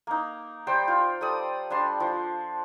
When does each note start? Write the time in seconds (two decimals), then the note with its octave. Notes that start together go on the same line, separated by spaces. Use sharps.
0.07 A#3 D#4
0.67 G3 C5 G5
0.88 F4
1.21 G3 A4 D5 D#6
1.70 G3 D4 A5 C6
2.00 F3